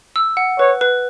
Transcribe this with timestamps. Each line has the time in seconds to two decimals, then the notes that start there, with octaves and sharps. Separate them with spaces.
0.16 E6
0.37 F#5
0.59 B4 C#5
0.81 B4